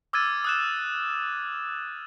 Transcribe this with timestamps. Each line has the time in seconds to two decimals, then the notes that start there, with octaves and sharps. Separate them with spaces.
0.13 D6 E6 F6 G#6 A6 D#7
0.45 D#6 F#6 E7